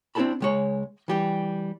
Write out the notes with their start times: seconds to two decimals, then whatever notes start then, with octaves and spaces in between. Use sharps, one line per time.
0.15 C4 D4 E4 A4 A5 B5
0.40 C#2 G#3 C#5
1.08 E3 G3 G4